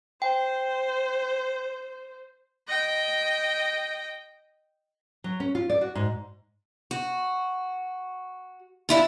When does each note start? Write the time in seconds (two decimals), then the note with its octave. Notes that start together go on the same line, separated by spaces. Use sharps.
0.22 C5 G5
2.68 D#5 G5
5.24 F#3
5.40 C#4
5.55 F4
5.70 D5
5.81 F#4
5.95 G#2
6.91 F#4
8.89 D4 E4 F4